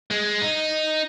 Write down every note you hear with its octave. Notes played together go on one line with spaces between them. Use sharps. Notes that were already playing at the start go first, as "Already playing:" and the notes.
G#3
D#4